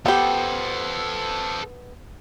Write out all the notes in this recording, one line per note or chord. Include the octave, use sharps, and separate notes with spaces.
B3 G4 A4 C5